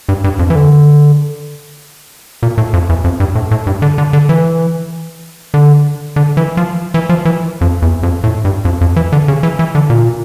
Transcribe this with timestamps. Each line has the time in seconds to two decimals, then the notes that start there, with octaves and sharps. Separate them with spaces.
0.09 G2
0.24 G2
0.39 F2
0.50 E3
0.56 D3
2.43 A#2
2.58 A2
2.73 F2
2.89 E2
3.04 F2
3.20 G2
3.35 A2
3.51 A2
3.67 G2
3.82 D3
3.98 D3
4.13 D3
4.29 E3
5.54 D3
6.16 D3
6.37 E3
6.57 F3
6.94 E3
7.09 F3
7.25 E3
7.61 F2
7.82 E2
8.03 F2
8.24 A2
8.45 G2
8.65 F2
8.81 F2
8.96 E3
9.12 D3
9.28 C#3
9.43 E3
9.59 E3
9.75 D3
9.90 A#2